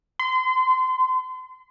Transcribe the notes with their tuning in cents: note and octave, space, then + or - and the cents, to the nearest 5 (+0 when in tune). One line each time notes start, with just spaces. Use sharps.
C6 -30